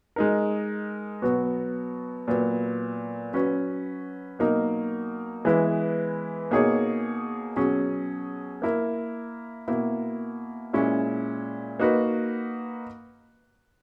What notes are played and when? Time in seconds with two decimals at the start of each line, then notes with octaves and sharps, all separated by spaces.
0.16 G#3 D#4 A#4
1.22 B2 F#3 B3 F#4
2.28 A#2 F#3 B3
3.33 F#3 C#4 F#4 B4
4.39 B2 F#3 A#3 D#4 A#4
5.45 E3 G#3 B3 E4
6.51 B2 A#3 D#4 G#4 C#5
7.56 B2 F#3 C#4 G#4
8.62 A#3 E4 A#4
9.68 B2 A#3 E4
10.73 A#2 G#3 C#4 E4
11.79 A#3 D#4 F#4 B4